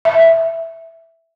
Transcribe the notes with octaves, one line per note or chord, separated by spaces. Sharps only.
E5